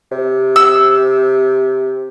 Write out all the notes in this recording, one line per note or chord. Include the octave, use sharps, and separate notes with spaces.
C3
E6